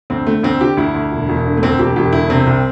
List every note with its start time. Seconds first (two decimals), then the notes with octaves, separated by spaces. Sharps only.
0.10 D2 C4
0.27 D3 A3
0.43 D2 C4
0.60 D3 G4
0.77 D2 E4
0.95 D2
1.12 E1
1.29 E1
1.45 D3
1.57 A3
1.63 D2 C4
1.79 E1 G4
1.96 E1 G4
2.13 D3 E4
2.30 C3 C4
2.46 C2